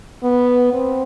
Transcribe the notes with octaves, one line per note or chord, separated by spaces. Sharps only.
B3
C4